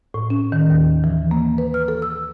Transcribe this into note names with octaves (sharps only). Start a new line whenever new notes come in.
A2
C#4
D#3
D#2
E3
A#3
B4
F6
A4
E6